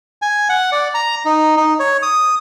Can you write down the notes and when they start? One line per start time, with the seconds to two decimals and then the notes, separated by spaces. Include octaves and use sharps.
0.22 G#5
0.49 F#5
0.72 D5
0.94 A#5
1.25 D#4
1.57 D#4
1.80 C#5
2.02 D#6